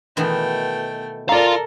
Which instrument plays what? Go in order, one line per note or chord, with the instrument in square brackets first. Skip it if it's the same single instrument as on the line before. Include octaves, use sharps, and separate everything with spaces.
[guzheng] B2 D#3 E3 [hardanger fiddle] A3 G5
[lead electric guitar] F4 F5 [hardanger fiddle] A4 A#4 [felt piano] D5 A#5